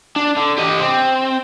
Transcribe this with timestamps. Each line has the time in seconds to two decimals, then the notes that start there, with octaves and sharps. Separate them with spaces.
0.16 D4
0.37 D3
0.58 G4 D#5
0.80 C4